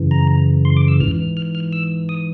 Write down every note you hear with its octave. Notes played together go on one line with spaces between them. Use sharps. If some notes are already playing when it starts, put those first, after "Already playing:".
Already playing: F#2 C#3 E3
A#5
C6
D6
E6
G#2 E3 F6
F6
F6
E6
D#6